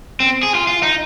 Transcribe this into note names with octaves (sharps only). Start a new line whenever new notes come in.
C4
G#4
F4
F4
D#4